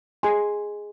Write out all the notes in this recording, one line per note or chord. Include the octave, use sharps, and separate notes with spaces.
G#4 D#5 G#5 C6